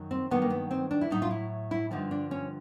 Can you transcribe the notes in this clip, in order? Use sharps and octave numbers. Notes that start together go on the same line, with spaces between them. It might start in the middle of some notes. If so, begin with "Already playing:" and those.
Already playing: F#2 D#3 F#3
C4
G2 D#3 F#3 A#3 B3
A#3
B3
C4
D4
E4
A2 F#3 A3 D#4
F4
E4
E4
G2 D3 F3 D#4
D4
C#4